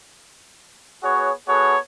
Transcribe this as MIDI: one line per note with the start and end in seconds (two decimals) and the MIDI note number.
1.03 1.31 59
1.03 1.31 66
1.03 1.31 68
1.03 1.31 73
1.47 1.77 59
1.47 1.77 66
1.47 1.77 68
1.47 1.77 69
1.47 1.77 73